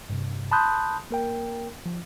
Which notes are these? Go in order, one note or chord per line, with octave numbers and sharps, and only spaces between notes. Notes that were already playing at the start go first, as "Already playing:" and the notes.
G2 C3
A5 B5 C6 D#6 F#6 G6
A#3 A#4 G5
F3